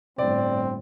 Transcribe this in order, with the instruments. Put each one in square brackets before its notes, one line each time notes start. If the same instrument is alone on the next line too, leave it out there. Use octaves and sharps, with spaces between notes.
[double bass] G1 A2 [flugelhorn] C4 [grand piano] D5